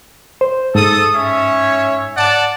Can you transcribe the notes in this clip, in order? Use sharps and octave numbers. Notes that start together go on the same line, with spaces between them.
C5
G#2 A4 D#6
C#4 C#5 E5
D5 F#5 A5